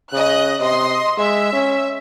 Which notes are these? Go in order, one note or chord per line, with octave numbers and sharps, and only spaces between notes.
C#3 D#5 F#6
C3 D#5 C6
G#3 E5
C#4